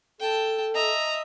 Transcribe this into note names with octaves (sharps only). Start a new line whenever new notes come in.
A4 G5 A5
D#5 E5 A#5